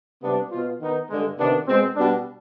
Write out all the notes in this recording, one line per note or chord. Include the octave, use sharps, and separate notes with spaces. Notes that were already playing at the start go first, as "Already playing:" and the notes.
C3 G3 B3 D4
B2 B3 F4
D#3 B3 D#4
G2 D3 G#3
C3 D#3 B3 D4
B2 G#3 C4
B2 G3 B3 D4